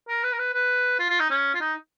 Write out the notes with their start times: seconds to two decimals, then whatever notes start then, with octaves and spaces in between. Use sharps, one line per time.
0.08 A#4
0.23 B4
0.32 A#4
0.39 B4
0.54 B4
0.99 F4
1.10 F4
1.20 D#4
1.30 C#4
1.55 F4
1.61 D#4